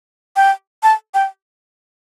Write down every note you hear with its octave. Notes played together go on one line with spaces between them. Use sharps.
G5
A5
G5